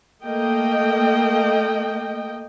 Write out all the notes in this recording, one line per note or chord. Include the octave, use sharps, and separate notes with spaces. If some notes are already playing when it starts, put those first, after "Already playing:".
A3 A#3 D#5 G5